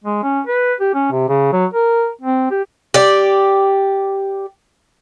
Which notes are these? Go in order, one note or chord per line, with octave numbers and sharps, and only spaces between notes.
G#3
C#4
B4
G4
C#4
C3
C#3
F#3
A#4
C4
G4
G4 D5